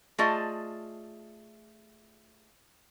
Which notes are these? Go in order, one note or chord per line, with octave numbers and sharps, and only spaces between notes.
A3 F4 G#4 D5 D#5 A5